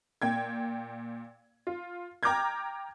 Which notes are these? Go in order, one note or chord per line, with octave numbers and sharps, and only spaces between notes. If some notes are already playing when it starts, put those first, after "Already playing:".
A#2 G5 G#6
F4
G5 A#5 D6 F6 G6 G#6